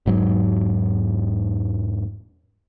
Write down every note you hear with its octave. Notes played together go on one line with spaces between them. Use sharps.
E1 G#2 F#3